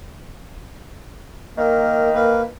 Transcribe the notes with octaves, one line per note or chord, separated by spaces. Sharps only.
D#3 A#3
A#3 B4